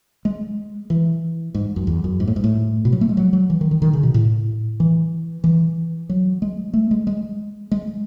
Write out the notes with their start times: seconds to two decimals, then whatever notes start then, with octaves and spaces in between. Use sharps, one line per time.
0.25 G#3
0.90 E3
1.55 G#2
1.76 F#2
1.87 E2
2.04 F#2
2.20 G#2
2.27 A2
2.36 G#2
2.44 A2
2.85 B2
2.93 F#3
3.01 A3
3.09 G#3
3.17 F#3
3.33 F#3
3.50 E3
3.61 D#3
3.71 D#3
3.82 D#3
3.93 C#3
4.03 B2
4.14 A2
4.80 E3
5.44 E3
6.09 F#3
6.42 G#3
6.74 A3
6.91 G#3
7.07 G#3
7.71 G#3